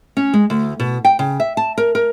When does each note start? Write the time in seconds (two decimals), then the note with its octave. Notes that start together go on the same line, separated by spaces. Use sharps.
0.17 C#4
0.33 G#3
0.50 D2
0.80 B2
1.05 G5
1.19 C#3
1.40 E5
1.57 A5
1.78 A#4
1.95 A#4